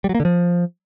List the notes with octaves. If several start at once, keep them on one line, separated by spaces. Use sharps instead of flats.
G3
F#3
A#3
D3
F3